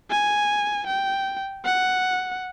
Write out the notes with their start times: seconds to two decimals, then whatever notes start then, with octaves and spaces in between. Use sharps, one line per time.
0.11 G#5
0.87 G5
1.64 F#5